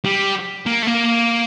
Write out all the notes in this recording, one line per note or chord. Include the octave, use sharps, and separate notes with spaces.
G3
A#3
A3
A#3